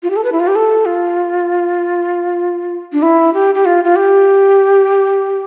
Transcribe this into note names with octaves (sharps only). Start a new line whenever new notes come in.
F4
G4
A4
B4
E4
F4
G4
A4
F4
D4
E4
G4
G4
F4
F4
G4